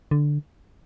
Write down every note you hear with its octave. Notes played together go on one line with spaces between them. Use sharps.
D3